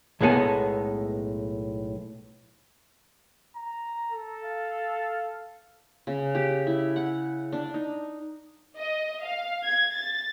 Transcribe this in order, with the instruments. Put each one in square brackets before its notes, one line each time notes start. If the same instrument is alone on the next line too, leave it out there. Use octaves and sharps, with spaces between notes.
[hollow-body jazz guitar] B1 A2 G#3 B3 A4 G#5
[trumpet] A#5
[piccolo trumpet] A4
[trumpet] F5
[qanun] C#3
G4
E4
F#5
D4
D#4
[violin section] D#5
F5
G#6
A6